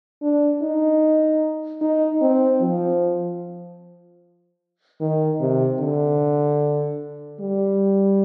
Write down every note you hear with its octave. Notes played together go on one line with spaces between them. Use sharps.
D4
D#4
D#4
C4
F3
D#3
C3
D3
G3